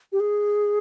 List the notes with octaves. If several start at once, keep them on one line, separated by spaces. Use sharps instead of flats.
G4
G#4